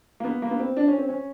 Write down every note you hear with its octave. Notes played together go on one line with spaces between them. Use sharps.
A#3
B3
A#3
B3
C4
D4
C#4
C4
C#4